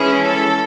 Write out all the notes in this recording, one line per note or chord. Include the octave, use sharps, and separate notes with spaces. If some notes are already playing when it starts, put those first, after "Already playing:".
Already playing: E3 G#3 C#4 E4 G#4
A4